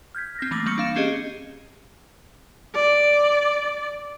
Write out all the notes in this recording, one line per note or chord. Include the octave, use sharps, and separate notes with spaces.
F6 G6 G#6 B6
C4 F6 A#6
E3 A3 A#3 D6
G3 A#3 C#6 C#7
D4 F5 E7
C4 C#4 G4 G#4 D#5
D5